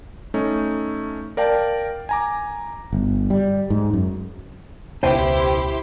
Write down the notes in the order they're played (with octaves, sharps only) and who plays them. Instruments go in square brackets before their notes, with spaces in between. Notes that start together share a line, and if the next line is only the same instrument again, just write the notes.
[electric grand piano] A3 C#4 D#4
A#4 D5 F5 G5 A5
G#5 A#5 D6
[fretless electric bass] G1
G3
G#2
F#2
[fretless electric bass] E1 C#2 [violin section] E4 G4 C6 [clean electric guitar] B4 C5 G5